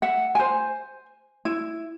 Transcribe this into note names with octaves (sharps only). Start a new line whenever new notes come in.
E5 F#5
C5 G#5
E4